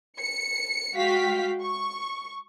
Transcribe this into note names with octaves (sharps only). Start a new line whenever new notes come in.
C#7
G#3 F#4 F5 G5 B6
C#6